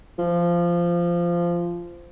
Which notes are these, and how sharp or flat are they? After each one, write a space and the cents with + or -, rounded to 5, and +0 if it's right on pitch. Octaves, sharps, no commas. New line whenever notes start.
F3 -15